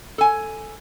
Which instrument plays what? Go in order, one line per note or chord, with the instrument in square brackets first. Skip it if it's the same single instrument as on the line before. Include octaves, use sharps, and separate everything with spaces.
[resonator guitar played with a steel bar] A4 G#5